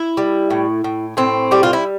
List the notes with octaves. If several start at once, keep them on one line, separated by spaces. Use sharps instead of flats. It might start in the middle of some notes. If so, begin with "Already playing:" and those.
Already playing: E4
G3
A2
A2
A2 C4
G3 G4
F4
E4